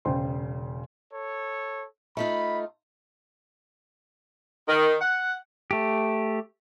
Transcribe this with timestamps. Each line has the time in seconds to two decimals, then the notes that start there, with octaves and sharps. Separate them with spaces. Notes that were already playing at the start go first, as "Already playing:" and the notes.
0.05 E1 C#3 C5 G5 C6
1.12 A4 C#5
2.17 A3 D#4 F4 B5
4.69 D#3
5.01 F#5
5.71 A3 G4